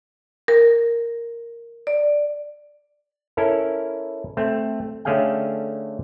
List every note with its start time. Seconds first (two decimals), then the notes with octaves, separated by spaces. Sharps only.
0.48 A#4
1.87 D5
3.37 C#4 E4 A4 A#4
4.37 A3 C4
5.05 D3 A3 C#4 G#4 F5 G5